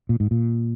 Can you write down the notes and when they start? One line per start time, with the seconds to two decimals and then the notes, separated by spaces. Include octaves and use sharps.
0.09 A#2
0.20 G#2
0.31 A#2